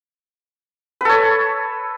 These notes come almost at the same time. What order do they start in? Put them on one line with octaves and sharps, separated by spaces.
B4 A4 C#5